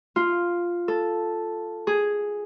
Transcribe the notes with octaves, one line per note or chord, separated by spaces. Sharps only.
F4
A4
G#4